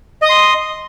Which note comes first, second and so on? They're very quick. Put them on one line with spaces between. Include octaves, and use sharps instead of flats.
D#5 D#6 C6